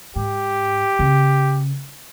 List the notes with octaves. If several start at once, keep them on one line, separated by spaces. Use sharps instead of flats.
G#2 G4
C#3